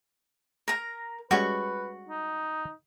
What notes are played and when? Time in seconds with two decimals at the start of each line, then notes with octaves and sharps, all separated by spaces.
0.68 A#4 A#5
1.31 G3 G#3 C#4 F#4 B4 C#6
2.08 D#4